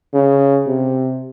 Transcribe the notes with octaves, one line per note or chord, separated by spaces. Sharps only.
C#3
C3